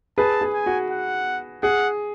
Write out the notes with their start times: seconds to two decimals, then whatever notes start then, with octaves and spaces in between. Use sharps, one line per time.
0.18 G#4 B4 A5
0.41 G#4
0.53 G#5
0.66 F#4
0.90 F#5
1.63 G#4 F#5